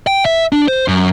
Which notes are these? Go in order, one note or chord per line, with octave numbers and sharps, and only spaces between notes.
G5
E5
D4
C5
F#2